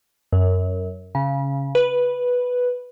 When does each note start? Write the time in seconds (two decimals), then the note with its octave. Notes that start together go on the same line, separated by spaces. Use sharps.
0.32 F#2
1.15 C#3
1.75 B4